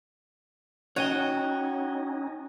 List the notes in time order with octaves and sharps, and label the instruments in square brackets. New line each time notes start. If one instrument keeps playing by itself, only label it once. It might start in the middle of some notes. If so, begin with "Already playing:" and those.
[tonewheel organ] C#4 D#4 [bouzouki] F#4 [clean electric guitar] C#5 D#5 G5